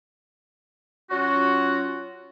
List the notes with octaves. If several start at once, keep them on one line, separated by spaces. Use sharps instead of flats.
F#3 C#4 F4 F#4